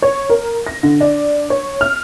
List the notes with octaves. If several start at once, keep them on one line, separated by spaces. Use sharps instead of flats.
C#5
A#4
A#6
D3
D4
C#5
F6